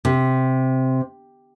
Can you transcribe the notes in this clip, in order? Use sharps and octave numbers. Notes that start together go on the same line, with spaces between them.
C3